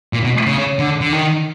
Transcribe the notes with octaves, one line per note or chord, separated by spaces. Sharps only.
A#2
B2
C#3
D3
D3
D#3